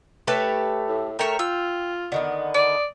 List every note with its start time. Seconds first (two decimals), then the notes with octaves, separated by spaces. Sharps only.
0.27 A3 G4 A4 B4 C#5
0.88 A2
1.19 A3 A#4 C#5 G5
1.39 F4 E6
2.12 D3 D#3 B3
2.54 D5 D#5